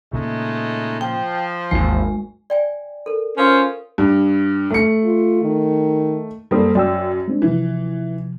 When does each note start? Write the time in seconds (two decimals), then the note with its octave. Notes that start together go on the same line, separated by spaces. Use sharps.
0.13 A#2 C#3 G#3 A3 D#4
1.01 F3 G5
1.71 G#1 D#2 E3 G#3
2.50 D5 G5 G#5
3.06 A4 A#4
3.38 C#4 F4 A#4 C5 D#6
3.98 G2
4.70 A3 C#7
5.04 F4
5.42 D#3
6.51 F#2 G3 A#3 C4 A4 D#6
6.75 F#2 D5 G5 E6
7.28 G#3 C4 D4
7.42 C3 E3 F3